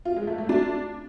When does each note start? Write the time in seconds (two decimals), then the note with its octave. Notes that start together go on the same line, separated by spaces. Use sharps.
0.05 F4
0.16 G#3
0.27 A3
0.38 A3
0.49 D4